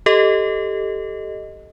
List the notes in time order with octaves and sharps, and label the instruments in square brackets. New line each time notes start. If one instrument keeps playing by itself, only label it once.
[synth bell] G4 A4 D#5